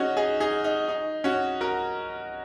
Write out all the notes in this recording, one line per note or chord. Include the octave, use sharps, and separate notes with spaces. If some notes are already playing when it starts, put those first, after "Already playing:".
Already playing: C#4 D#4 F#4 G#4
D#4 G#4
D#4 G#4
D#4
D#4
C#4 F#4
F#4 A#4